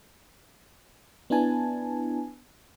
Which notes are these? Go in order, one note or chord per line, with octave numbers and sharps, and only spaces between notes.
B3 D4 E4 B4 G#5 A5